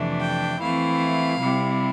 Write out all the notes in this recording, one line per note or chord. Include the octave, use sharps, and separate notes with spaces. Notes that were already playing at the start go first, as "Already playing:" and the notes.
Already playing: F2 C3 E3 A3 D4
G5
E3 A3 C4 E4 F5
C3 G3 C4 E4